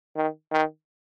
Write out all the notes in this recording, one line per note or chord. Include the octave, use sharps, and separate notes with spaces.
D#3
D#3